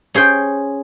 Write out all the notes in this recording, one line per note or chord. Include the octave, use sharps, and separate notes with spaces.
C#4 G#4 C5 G5